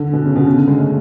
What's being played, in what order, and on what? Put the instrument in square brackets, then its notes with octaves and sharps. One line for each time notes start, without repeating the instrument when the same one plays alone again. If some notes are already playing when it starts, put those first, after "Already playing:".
Already playing: [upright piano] D3
B2
C#3
B2
C#3
D3
G#3
A3